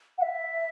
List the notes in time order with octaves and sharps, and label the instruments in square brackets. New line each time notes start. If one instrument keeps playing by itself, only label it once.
[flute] F#5
E5